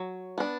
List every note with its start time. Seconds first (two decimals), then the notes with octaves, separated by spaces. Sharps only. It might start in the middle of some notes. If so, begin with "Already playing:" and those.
Already playing: F#3
0.38 B3 D4